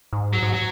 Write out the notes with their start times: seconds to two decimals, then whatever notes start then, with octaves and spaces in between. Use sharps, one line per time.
0.13 G#2
0.33 F#3
0.43 G#2
0.53 F#3